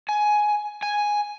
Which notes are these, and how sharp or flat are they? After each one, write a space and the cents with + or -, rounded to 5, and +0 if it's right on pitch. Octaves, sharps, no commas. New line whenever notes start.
G#5 +10
G#5 +0